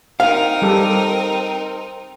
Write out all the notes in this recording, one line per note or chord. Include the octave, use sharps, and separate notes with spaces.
C4 D#4 A#4 F5
G3 G4 A4